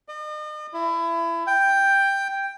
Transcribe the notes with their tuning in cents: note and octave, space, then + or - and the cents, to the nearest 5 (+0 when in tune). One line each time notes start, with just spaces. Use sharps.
D#5 -40
E4 +25
G5 +5